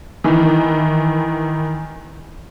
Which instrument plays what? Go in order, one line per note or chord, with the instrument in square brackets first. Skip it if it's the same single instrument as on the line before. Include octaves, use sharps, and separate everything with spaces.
[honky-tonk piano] D#3 E3